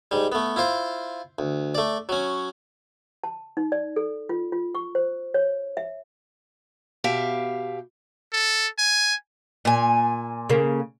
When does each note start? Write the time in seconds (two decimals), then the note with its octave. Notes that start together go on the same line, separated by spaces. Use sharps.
0.11 G#2 G3
0.32 A3 B3
0.56 E4 F4 C5 C6
1.39 D2
1.75 A3 D5
2.09 F#3 C#4
3.24 A5
3.57 D#4
3.72 D5
3.96 A4
4.29 F4
4.52 F4
4.75 C#6
4.95 C5
5.34 C#5
5.77 E5
7.04 B2 G4 E5 F5
8.33 A4
8.78 G#5
9.65 A#2 G#5
10.50 C#3 A#3